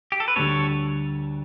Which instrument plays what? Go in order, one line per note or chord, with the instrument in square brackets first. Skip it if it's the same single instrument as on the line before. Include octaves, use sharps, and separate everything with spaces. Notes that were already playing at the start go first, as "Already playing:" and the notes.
[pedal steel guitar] G4
A4
B4
[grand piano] D2 D3 G3 D4 [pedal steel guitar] A4 C#5